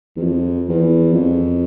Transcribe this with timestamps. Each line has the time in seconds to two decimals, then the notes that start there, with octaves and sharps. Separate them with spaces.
0.16 E2
0.22 F2
0.68 E2
1.13 F2